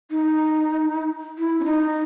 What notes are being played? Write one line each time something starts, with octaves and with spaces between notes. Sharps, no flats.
D#4
E4
C#4
D#4